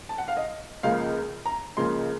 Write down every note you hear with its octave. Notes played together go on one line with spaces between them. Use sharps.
A5
F#5
F5
D#5
C#2 C#3 F3 A#3 F5
A#5
C#2 C#3 F3 A#3 C6